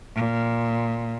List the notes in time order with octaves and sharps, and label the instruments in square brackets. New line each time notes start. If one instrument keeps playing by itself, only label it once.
[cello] A#2